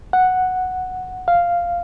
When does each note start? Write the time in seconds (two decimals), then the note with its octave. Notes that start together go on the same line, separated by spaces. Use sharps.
0.13 F#5
1.28 F5